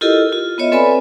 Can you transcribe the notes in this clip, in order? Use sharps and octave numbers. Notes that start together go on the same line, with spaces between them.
E4 F4 G4 A4 A#4 D#5
F4
B3 F4 C#5 D#5 E5
C4 A4 B4 D5 G#5 B5